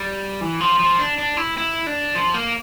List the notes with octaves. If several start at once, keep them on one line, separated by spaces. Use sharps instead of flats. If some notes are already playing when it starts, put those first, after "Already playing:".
Already playing: G3
E3
F3
F3
D4
D4
E4
E4
D4
F3
A#3